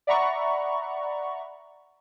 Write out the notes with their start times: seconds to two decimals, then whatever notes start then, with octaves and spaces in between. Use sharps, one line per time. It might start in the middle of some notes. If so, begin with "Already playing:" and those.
0.07 D5 E5 F#5 A#5 B5 C#6